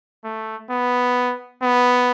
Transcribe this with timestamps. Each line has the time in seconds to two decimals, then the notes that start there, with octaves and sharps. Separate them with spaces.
0.24 A3
0.71 B3
1.63 B3